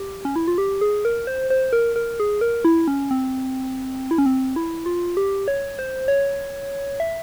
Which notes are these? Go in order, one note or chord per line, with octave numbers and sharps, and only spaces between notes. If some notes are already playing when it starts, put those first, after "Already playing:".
Already playing: G4
C#4
E4
F4
G4
G#4
A#4
C5
C5
A#4
A#4
G#4
A#4
E4
C#4
C4
E4
C#4
C4
E4
F4
G4
C#5
C5
C#5
E5